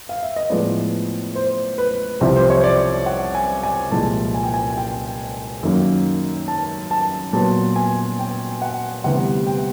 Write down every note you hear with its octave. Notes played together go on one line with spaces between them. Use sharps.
F5
E5
D#5
A2 F3 G#3 B3 D5
C5
B4
C2 C3 F3 C5
C5
C#5
D5
F#5
G#5
G#5
C2 A#2 F3 G#3 A5
G#5
G5
G#5
G5
F#2 D#3 F#3 A#3
A5
A5
A#2 F#3 B3 A5
G#5
G5
F#5
D2 C3 E3 G3 B3 F#5
G5